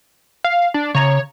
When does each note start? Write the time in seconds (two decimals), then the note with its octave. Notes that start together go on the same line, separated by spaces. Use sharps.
0.44 F5
0.74 D4
0.95 C#3 C#5 A#5